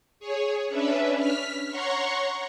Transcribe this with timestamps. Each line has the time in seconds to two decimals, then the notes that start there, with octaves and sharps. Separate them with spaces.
0.19 G#4 C#5
0.68 C#4 D4 B4 E5
1.17 F6 B6
1.69 C#5 F#5 A#5 C6 C#6